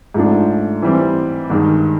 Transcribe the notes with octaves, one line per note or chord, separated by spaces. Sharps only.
G#2 F3 A3 D4
E3 G3 C4
G2 D#3 G#3